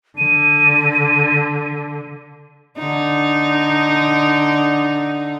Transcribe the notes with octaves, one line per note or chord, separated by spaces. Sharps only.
D3 D#7
D3 D#4